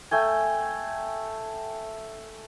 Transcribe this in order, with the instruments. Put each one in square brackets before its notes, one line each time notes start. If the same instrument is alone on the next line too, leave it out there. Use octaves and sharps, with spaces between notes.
[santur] A3 G5 G#5